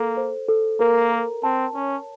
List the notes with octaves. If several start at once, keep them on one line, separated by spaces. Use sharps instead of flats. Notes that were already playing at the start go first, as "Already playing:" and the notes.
Already playing: A#3 A4
C5
A4
A#3 A#4
A#5
C4 A5
C#4 C#5